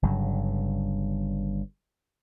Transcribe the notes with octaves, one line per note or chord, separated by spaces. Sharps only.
G1 G2 C#3 F#3